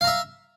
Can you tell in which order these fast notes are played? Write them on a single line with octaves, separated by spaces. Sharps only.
F5 A#5 E5